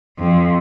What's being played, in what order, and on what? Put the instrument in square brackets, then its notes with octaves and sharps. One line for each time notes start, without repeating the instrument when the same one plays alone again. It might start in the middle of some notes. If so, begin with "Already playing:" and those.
[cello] F2